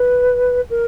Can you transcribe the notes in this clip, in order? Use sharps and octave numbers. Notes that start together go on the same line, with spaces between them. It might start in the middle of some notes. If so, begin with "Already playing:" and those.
Already playing: B4
A#4